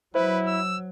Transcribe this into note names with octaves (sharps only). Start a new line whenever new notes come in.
F#3 E4 B4 C5
E6